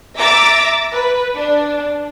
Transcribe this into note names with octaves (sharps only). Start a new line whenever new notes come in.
E5 A#5 D6 E6 A6
B4
D4